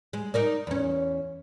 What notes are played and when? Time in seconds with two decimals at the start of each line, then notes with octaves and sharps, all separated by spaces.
0.13 G#3
0.34 D#4 A#4 D5
0.67 E2 C#4